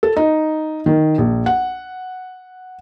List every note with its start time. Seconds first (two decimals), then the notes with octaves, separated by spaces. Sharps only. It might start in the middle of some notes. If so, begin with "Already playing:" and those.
0.03 A4
0.16 D#4
0.86 D#3
1.18 A#1
1.46 F#5